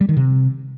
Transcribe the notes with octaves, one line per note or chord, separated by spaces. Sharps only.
G3
D#3
C3